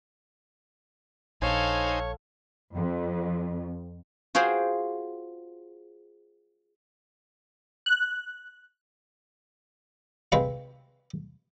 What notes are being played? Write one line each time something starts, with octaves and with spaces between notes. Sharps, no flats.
A#1 D#4 A4 C5 C#5 F5 G#5
F2
F4 F#4 G#4 C5 G5
F#6
C3 G#3 B4 F5